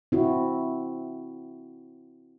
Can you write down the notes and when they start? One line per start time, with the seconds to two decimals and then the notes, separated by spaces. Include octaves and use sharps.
0.12 C4 E4 F#4